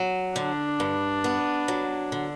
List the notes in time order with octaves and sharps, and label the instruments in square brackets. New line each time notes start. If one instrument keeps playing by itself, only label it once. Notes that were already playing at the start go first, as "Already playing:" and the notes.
Already playing: [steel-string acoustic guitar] F#3
[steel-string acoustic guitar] D3 [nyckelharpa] D4
[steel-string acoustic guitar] G2
B3
F#3
D3